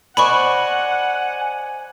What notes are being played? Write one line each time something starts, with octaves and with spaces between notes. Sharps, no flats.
C5 D5 D#5 F#5 G#5 B5 C#6